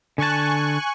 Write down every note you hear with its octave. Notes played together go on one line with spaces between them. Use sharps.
D3 G#5 A5 C#6 F#6